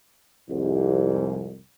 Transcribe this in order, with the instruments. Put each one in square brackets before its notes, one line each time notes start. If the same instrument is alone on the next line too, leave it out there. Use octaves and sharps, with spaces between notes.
[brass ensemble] C2 F2 G#2